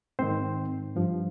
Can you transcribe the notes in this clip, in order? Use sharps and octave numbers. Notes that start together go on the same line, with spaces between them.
G#2 D#3 C4 C5
G2 F3